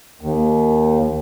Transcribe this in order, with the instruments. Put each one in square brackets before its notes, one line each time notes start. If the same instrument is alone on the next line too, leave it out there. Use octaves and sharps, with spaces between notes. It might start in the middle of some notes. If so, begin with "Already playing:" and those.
[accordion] D#2